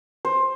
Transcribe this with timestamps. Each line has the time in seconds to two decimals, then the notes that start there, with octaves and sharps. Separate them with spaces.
0.25 C5